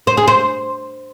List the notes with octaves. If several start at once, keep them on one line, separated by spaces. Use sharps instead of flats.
C5
G#4
C5